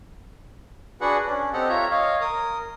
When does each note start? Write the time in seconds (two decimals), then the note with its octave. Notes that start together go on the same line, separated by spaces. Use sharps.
1.01 D4 F#4 G#4 B4 F#5
1.27 C#4 D4
1.53 C4 G4 A4 D#5 F#5
1.69 F4 C#5 E5 A#5
1.91 C#5 D#5 F5
2.21 A#4 D#6